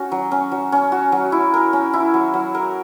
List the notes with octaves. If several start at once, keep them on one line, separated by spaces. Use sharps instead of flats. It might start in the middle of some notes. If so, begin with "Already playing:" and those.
Already playing: C#4 F#4
F#3
C#4
F#3
C#4
F#4
F#3
E4
A#4
C#4
E4
F#3
F#3
A#4